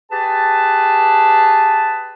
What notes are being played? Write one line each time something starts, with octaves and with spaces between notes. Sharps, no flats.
G4 G#4 B4 A5